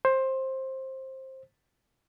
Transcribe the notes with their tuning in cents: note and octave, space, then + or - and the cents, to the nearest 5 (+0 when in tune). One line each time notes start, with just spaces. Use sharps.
C5 +15